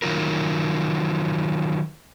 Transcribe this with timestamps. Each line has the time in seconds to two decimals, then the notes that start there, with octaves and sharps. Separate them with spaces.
0.02 D#3 F#3 F4 A#4